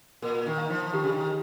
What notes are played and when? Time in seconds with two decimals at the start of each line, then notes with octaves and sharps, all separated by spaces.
0.22 A#2 A#4
0.46 D#3
0.58 F5 A#5
0.70 F3
0.93 D#3 G4
1.04 C#3
1.12 D#3